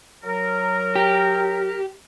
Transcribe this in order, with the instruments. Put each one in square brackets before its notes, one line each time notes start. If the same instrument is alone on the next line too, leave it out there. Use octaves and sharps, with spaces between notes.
[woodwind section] F#3 A#4
[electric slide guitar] G4